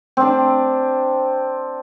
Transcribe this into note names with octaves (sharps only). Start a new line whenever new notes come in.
C4 D4